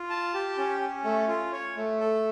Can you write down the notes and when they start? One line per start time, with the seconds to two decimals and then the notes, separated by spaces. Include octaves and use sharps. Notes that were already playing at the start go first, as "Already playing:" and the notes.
Already playing: F4
0.10 A5
0.34 G4
0.58 C#4
0.81 C#4
1.04 A3
1.28 F4
1.52 C#5
1.76 A3
2.00 A4